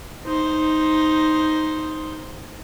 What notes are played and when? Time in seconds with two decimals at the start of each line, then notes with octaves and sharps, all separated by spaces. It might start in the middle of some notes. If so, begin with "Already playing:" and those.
0.24 D#4 C5